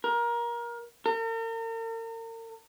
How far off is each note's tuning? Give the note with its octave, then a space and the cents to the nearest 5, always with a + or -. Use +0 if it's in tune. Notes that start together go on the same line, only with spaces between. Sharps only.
A#4 +25
A#4 -40